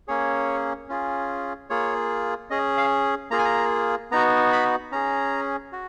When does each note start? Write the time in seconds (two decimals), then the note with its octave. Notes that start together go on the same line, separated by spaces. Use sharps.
0.08 A#3 C#4 G#4 C#5
0.89 C#4 F4 G#4
1.70 A#3 F4 G#4 C#5
2.50 C#4 G#4 D#5
2.77 F5
3.31 A#3 F4 G#4 A#5
3.38 G#5
3.45 A#5
4.11 B3 D#4 F#4 A#5
4.52 B5
4.92 C#4 G#4 A#5
5.73 F#4